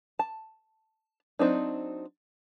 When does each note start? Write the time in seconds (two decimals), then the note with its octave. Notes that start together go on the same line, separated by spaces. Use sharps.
0.19 A5
1.39 F#3 C4 D4 D#4